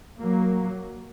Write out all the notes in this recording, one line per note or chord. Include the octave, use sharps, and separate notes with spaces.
F#3 A#3